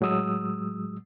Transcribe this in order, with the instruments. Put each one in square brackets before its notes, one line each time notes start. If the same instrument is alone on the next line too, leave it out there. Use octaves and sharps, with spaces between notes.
[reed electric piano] A2 F#3 G#3 D#6 E6